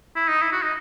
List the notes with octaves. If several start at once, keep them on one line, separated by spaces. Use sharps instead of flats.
E4
D#4
E4
F#4
D#4